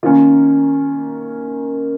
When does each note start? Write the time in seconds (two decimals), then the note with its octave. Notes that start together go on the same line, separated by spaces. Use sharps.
0.03 D#3 A#3 C#4 F4